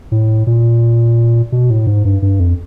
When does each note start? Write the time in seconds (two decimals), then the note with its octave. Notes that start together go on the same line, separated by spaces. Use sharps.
0.12 A2
0.47 A#2
1.52 B2
1.70 A2
1.87 G#2
2.05 G2
2.22 G2
2.40 F2